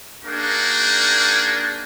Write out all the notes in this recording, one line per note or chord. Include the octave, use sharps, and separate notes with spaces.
A#3 D4 D#4 F#4 G#4